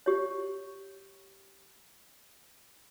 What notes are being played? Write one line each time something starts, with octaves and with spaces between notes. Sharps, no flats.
G4 C#5